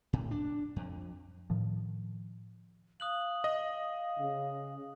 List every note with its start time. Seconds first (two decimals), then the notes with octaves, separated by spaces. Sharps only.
0.13 A2
0.31 D4
0.76 F2
1.50 A2 D#3 F3
3.00 F5 D#6 F#6 F#7
3.44 D#5
4.19 C#3